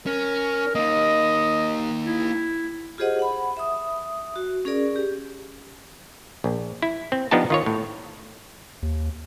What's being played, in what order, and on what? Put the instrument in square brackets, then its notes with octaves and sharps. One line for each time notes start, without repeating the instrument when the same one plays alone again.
[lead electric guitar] C#4 [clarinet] A#4
[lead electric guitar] A#3 D#4 [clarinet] D#5
[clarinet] E4
[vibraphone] F4 G4 G#4 C5 D#5 F#5
F#5 B5
E5 D#6
F#4
C#4 G#4 A#4 D5
G4
[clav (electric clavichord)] A#1
E4
C4
F3 B3 D4 D#4 G4 A5
D#3 F4 C#5
A2
[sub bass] D#2